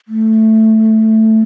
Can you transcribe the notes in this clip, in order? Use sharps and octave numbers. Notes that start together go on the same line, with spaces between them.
A3